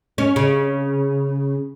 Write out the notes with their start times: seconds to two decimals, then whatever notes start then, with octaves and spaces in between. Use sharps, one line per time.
0.18 C#4
0.36 C#3